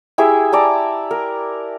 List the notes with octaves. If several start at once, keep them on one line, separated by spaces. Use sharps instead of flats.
E4 G4 G#4 E5
D5 A5 A#5
A#4